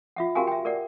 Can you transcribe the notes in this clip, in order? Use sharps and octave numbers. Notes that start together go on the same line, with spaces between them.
F4 E5 F#5
F#4 G4 A#4 F5 G5 G#5
E5 G5
A#4 D5 F#5